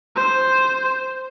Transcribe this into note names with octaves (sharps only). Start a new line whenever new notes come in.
C5